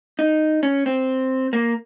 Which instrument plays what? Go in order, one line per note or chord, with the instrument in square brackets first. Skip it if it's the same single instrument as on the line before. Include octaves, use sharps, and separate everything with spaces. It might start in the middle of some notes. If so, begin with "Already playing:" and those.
[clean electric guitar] D#4
C#4
C4
A#3